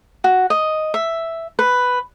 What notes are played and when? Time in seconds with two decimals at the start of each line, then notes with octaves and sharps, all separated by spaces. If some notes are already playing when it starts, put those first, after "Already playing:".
0.24 F#4
0.50 D#5
0.94 E5
1.59 B4